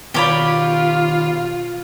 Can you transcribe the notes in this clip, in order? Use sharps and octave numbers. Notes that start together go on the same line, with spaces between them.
B2 D#3 F4 G4 C#5 D5 B5